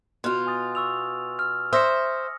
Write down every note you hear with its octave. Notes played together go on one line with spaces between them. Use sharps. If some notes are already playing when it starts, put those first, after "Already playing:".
B2 F4 C6 F6
G#5 D#6 A6
C#6 E6 F7
F6
C5 E5 D#6 A#6 C#7